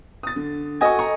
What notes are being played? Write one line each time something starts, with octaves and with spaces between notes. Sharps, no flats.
D#6 A6
D3
F#4 A4 D#5 G#5 C#6
A#5 C#6